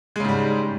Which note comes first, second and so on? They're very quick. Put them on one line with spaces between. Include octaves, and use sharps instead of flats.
G#3 C#3 G#2 G3